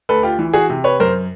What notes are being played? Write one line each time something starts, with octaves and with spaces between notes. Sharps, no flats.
D2 A4 B4
F4 G4
E3
F#4 G#4
C3
B4 C#5
F#2 A#4 C5